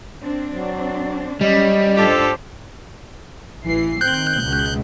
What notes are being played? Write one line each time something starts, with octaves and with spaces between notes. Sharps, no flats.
C4 D4
F#3
F#3 G3 C#4 C#5 D#5
G#2 D4 F4 G4 A4 C5
A1 E3 C7
D#3 C4 F#6 G6
C#2 B2